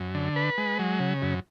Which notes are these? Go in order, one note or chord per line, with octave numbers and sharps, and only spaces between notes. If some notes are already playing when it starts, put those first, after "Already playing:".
Already playing: F#2
D3
B4
G#3
F#3
C#3
F#2